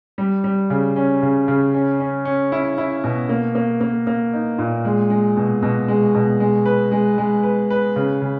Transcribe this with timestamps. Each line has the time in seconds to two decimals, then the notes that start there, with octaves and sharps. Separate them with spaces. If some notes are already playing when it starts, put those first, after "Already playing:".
0.18 G3
0.44 G3
0.70 C#3
0.96 C#4
1.23 C#3
1.48 C#3
1.74 C#4
2.00 C#4
2.25 C#4
2.52 E4
2.78 E4
3.04 B2
3.29 A#3
3.55 A#3
3.80 A#3
4.07 A#3
4.33 D#4
4.58 A#2
4.85 G#3
5.10 G#3
5.37 B2
5.62 B2
5.88 G#3
6.14 B2
6.40 G#3
6.66 B4
6.91 G#3
7.18 G#3
7.43 B4
7.70 B4
7.96 C#3
8.21 C#3